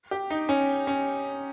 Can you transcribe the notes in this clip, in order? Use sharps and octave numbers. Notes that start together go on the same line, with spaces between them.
G4
D#4
C#4
C#4